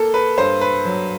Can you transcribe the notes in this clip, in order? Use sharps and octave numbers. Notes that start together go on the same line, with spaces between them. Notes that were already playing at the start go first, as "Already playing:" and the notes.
Already playing: A#3 A4
B4
G2 C5
B4
F#3